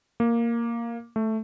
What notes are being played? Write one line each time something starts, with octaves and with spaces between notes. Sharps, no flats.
A#3
A3